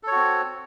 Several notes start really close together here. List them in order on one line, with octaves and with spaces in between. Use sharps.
A4 C#5 F#4 C4